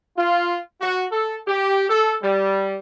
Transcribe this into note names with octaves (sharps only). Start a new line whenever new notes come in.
F4
F#4
A4
G4
A4
G3